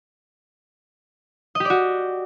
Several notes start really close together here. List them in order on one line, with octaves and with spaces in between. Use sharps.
D#5 G4 D5 F#4